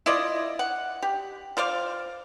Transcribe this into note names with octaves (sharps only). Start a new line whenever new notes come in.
E4 F4 D5 D#5
F#5
G4
F4 C5 D5 F5